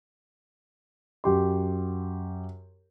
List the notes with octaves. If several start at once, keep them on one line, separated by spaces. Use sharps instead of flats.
F#2 G4 C6